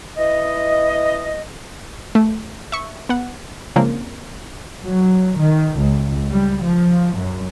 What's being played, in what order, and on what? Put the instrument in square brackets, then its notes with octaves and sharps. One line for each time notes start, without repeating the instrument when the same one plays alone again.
[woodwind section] E4 B4 D#5
[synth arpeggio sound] A3
E5 C#6
B3 F#5
C#3 F3 G#3 A#3 C4 D4
[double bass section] F#3
D#3
C#2
G3
F3
F#2